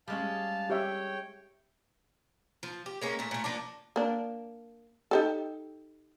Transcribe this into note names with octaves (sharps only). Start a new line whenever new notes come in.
G3 G#3 C#4 F5 A5
G4 C#5 E5 G5
F3
G4
G#3 A#3 C#4
A#2 A3
A#2 A3
F3 A#3 D4
A#3 D4
D#4 G4 A4